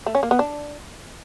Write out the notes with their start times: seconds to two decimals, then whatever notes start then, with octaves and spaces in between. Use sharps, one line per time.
0.06 A3
0.15 C#4
0.23 A#3
0.31 B3
0.39 D4